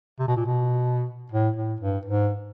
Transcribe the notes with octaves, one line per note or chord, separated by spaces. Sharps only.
C3
B2
A#2
B2
A2
A2
G2
G#2